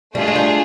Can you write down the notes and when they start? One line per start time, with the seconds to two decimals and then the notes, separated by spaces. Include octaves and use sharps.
0.14 G3 A3 D4 F4 G#4
0.28 G#3
0.35 G3